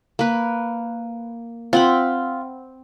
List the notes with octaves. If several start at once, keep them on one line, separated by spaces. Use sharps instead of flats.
A#3 B4
C4 F4 F#5 B5